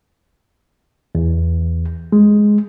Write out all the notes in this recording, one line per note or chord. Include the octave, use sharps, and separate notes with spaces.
E2
G#3